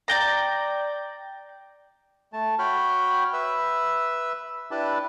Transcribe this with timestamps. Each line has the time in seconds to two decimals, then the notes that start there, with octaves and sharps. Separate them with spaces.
0.08 D5 G5 A#5
2.33 A3 A5
2.59 F#4 C#5 G5 B5 F6
3.33 B4 E5 E6
4.71 D4 E4 G4 B4 A5